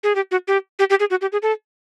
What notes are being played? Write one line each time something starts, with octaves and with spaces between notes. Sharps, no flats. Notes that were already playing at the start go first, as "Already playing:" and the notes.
G#4
G4
F#4
G4
G4
G4
G#4
F#4
G4
G#4
A4